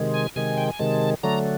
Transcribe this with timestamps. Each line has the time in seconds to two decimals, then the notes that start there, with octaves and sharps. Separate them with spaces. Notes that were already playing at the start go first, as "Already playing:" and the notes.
Already playing: C3 D#3 G#3
0.14 G#5
0.36 C3 D#3 G#3 G#5
0.57 G5
0.68 G#5
0.79 C3 D#3 G#3 A5
1.23 D3 F#3 A3 A#5